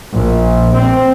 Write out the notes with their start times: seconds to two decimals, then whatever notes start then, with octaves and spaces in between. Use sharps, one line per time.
0.15 A#1
0.75 C4